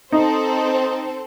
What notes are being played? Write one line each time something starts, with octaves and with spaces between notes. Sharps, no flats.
C4 D#4 A4 C5